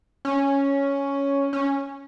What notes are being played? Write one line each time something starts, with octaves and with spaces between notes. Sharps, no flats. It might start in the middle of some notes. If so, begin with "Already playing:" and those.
C#4
C#4